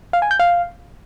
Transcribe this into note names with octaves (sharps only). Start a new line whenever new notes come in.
F5
G#5
G6
F5